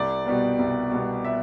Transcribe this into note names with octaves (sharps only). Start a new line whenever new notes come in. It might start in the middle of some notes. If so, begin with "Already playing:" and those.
Already playing: C2 D5
B2 G3 B3
C2
B2 G3 B3
E5